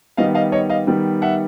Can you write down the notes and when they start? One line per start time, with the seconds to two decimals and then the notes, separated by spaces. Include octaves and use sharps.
0.17 D#3 G3 B3 D#5 F5
0.35 D#5 F5
0.52 C#5 D#5
0.70 D#5 F5
0.87 D#3 G3 B3
1.22 E5 F#5